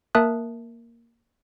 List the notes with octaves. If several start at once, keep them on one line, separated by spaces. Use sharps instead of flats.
A#3 A#4 E5 A5 D#6 F#6